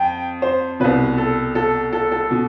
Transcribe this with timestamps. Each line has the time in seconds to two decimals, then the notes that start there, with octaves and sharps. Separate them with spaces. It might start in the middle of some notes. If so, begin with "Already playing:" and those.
Already playing: F2 G5
0.42 C5
0.80 C2 B2 B4
1.18 A4
1.55 A4
1.92 A4
2.11 A4
2.31 B2